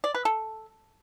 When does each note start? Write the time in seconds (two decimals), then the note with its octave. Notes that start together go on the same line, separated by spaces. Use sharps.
0.04 D5
0.15 B4
0.25 A4